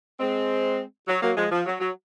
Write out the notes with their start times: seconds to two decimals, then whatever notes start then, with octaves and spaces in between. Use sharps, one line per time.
0.19 G#3 C4
1.08 F#3
1.22 F#3 A#3
1.36 F3 G#3
1.51 F3
1.66 F#3
1.80 F#3